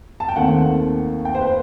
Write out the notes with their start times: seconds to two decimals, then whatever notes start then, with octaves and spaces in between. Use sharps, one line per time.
0.20 A5
0.29 G5
0.36 D#2 D#3 A3 C4 F#5
1.25 G5
1.35 C5
1.41 B4